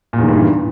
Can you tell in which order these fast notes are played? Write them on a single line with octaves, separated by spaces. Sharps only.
A#2 E2 D#3 G2 E3